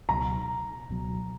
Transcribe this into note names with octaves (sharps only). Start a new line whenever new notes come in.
C#2 B2 F#3 A#5
C#2 B2 F#3